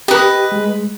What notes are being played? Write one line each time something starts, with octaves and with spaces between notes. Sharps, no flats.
G4 B4 D#5
G#3